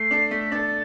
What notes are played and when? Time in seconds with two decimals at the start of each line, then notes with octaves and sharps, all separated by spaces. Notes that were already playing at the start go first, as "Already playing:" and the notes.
Already playing: A3 C7
0.11 D4 A4
0.31 A3 B6
0.52 D4 A4 A6